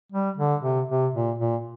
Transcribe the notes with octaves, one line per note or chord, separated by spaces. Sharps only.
G3
D3
C3
C3
A#2
A#2